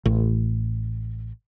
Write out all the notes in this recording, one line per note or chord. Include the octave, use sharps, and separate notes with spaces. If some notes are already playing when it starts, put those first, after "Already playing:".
A1